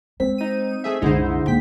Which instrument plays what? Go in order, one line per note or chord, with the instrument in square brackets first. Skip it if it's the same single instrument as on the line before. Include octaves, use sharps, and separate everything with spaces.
[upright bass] G#3 [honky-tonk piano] C4 [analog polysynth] B6
[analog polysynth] D#4 D#7
A3 G#4 E5
[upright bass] C2 F#2 [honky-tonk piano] D3 G#3 [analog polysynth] D#4 E4 C5
[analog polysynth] C2 G5 B6 [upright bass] G#2 A#3